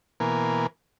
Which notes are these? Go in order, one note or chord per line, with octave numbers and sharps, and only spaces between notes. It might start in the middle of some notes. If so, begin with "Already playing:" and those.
B2 E3 A#3 A#4 G#5 B5